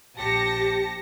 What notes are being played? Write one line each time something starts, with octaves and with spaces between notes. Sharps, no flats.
A#1 G4 A5 A#6 C#7